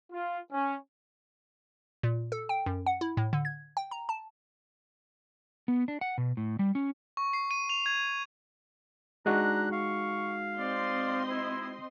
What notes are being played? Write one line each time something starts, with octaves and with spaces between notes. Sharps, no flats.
F4
C#4
A#2
A4
G5
F#2
F#5
E4
A2
D3
G#6
G5
A#5
A5
B3
D4
F#5
B2
A2
G3
C#4
C#6
C7
D#7
F7
G#6
G#3 D4 D#4 F#4 A#5 F#6
F5 C#6
C4 D5 D#5 C6
E4